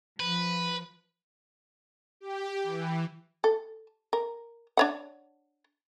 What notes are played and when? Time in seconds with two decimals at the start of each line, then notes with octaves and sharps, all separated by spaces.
0.20 F3 B4
2.20 G4
2.63 E3
3.44 A4
4.13 A#4
4.77 D4 C#5 F#5